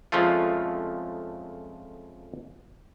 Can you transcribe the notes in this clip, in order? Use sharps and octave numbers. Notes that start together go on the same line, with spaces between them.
F2 C#3 F3 G#3 A3 F4